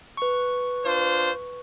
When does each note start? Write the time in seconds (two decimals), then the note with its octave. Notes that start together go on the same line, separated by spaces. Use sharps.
0.17 B4 C#6
0.84 D4 F4 C5